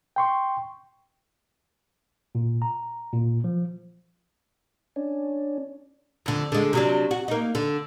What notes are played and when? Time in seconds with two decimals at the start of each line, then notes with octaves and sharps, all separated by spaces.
0.16 G5 C6 C#6
2.35 A#2
2.62 A#5
3.13 A#2
3.44 F3
4.96 C#4 D4
6.26 F2 D3
6.52 D3 G#3
6.73 C3 F#3 D4
7.11 F#4
7.28 A#3 D#4
7.55 D3